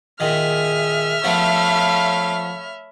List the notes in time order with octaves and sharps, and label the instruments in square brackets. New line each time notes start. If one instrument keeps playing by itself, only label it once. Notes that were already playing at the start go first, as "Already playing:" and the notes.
[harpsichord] A#2 D#3 [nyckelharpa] G#4 [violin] E5 F6
[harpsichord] F3 B3 [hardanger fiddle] A3 F5 [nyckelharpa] C#5 B5